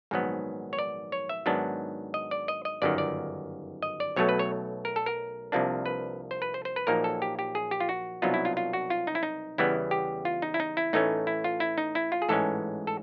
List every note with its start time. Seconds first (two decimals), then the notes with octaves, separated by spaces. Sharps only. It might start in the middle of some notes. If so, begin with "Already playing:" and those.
0.11 A#1 G#2 D#3 F#3 B3
0.73 C#5
0.79 D5
1.12 C#5
1.29 E5
1.46 G#2 D#3 F#3 B3 D4
2.14 D#5
2.31 D5
2.48 D#5
2.65 D#5
2.82 G1 F#2 D#3 D5
2.98 D5
3.82 D#5
4.00 D5
4.16 B1 B2 F#3 A3 C#5
4.29 B4
4.39 C#5
4.85 A#4
4.96 A4
5.06 A#4
5.52 C2 C3 F3 A#3 D4
5.86 B4
6.31 C5
6.42 B4
6.54 C5
6.65 C5
6.76 B4
6.87 A#1 A#2 F#3 A#3 D#4 A#4
7.04 A4
7.22 G4
7.39 G4
7.55 G#4
7.71 G4
7.80 F4
7.89 F#4
8.22 C2 B2 F#3 B3 D#4 F4
8.34 E4
8.45 F4
8.57 F4
8.73 F#4
8.90 F4
9.07 D#4
9.15 E4
9.23 D#4
9.58 E2 C#3 E3 G3 B3 E4
9.91 G4
10.25 F4
10.42 D#4
10.54 E4
10.60 D#4
10.77 E4
10.93 A2 E3 A3 C#4 D#4
11.27 E4
11.44 F4
11.60 E4
11.78 D#4
11.95 E4
12.12 F4
12.22 G#4
12.29 A1 G#2 E3 G#3 C#4 A4
12.87 A4